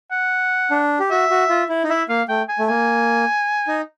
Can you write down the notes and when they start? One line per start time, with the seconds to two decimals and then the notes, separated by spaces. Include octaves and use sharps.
0.11 F#5
0.71 D4
1.00 G4
1.11 F#4 E5
1.30 F#4
1.50 F4
1.69 E4
1.84 D#4
1.89 E4 E5
2.09 A#3 F5
2.29 A3 G5
2.49 G#5
2.59 A3
2.68 A#3 G#5
3.67 D#4